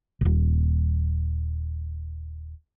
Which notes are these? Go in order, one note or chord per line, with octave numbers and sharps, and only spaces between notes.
D#1 G#1